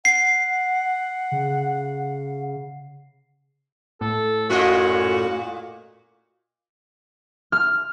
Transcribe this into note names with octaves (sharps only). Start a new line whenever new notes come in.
F#5 C7
C#3
A2 A4
F#2 A#2 F4 F#4 D#5
F6